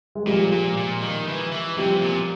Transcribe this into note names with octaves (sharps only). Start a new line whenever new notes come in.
G#3
A#2 F3 G3
A#2
A#2
D#3
E3
E3
C3 F3 G3
A#2